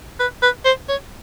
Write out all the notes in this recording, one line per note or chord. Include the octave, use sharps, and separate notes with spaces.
B4
B4
C5
C#5